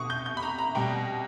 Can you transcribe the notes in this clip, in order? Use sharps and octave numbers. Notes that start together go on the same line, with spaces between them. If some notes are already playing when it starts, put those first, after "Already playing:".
Already playing: B2 C#6 D#6
G6
G6
B5
A#5
A#5
B2 G3 G5